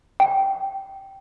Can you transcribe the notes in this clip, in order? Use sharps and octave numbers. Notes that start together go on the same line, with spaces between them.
G5